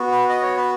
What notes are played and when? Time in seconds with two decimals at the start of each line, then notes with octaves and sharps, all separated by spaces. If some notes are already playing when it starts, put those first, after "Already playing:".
Already playing: B3 F#4
0.11 B4
0.29 D#5
0.42 C#5
0.57 B4